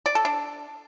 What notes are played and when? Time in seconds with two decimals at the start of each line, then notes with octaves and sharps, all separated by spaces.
0.06 D5
0.15 A4
0.25 D4